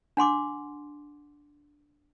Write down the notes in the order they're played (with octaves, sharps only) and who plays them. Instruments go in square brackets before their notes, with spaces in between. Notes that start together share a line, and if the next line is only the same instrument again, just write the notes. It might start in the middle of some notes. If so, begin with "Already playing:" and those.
[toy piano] D4 F#5 C6 D6